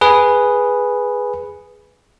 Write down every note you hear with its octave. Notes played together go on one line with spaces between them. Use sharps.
G#4 B4